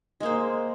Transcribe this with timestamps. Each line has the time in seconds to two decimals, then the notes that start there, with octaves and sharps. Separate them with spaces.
0.20 G#3
0.23 A#3
0.26 C5